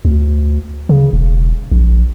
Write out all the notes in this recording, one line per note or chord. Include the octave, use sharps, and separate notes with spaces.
D2
C#3
E1
A#1